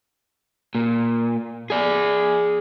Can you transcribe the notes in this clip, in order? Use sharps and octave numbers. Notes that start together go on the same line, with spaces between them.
A#2
G#4 D5